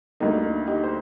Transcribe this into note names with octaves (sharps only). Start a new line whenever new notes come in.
D2 D3 G3 A#3 D#4
D#4
D#4 G4
C5